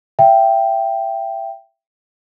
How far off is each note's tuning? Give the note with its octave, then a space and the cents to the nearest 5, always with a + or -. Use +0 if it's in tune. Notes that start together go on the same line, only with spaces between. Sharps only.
E5 +25 G5 +0